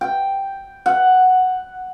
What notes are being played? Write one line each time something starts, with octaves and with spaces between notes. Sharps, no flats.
G5
F#5